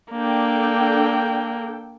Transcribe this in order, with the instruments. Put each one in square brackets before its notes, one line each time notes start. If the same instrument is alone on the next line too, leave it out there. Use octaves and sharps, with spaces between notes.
[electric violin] A#3 [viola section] D4 A4 G5